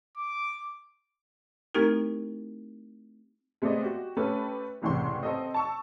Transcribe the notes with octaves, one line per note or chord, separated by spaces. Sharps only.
D6
A3 C4 D#4 E4 G4 A#4
G#3 A3 B3 C4 D5 D#5
F#4 G4
A3 C#4 G4 A4 B4
F#1 C2 A2 E3 G5 C6
C4 A4 D#5
A5 C#6 E6